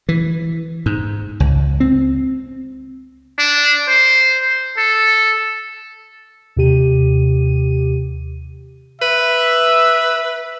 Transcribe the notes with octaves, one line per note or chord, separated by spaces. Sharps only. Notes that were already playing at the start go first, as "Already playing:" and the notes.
E3
G#2
C#2
C4
D4
C5
A4
D#2 C3 G4 D#7
B4 E5